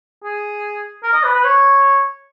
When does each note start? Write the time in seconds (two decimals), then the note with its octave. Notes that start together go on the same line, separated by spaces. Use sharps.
0.24 G#4
1.04 A#4
1.14 D#5
1.24 B4
1.35 B4
1.45 C#5